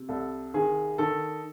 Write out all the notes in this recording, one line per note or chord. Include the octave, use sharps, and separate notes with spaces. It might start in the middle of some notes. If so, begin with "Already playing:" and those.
Already playing: C3
C2 A4
D#3 G#4
D#3 A4